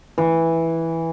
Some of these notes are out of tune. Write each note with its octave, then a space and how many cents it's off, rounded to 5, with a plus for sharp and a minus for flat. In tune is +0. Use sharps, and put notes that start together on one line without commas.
E3 -5